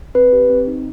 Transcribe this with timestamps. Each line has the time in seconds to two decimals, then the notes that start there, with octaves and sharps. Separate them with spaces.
0.15 C4 B4
0.33 G4
0.49 C4
0.68 D#4